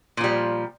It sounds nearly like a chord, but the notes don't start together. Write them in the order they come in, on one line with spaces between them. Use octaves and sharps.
A#2 F3 G3